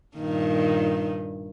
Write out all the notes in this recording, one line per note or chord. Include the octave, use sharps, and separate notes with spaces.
G2 A#2 D#3